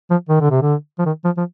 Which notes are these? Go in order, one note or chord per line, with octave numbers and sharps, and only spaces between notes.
F3
D#3
D3
C3
D3
F3
D#3
F3
F3